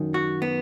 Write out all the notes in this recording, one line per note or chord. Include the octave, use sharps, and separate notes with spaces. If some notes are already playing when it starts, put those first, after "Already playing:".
Already playing: F#2 D#3
F#4
B3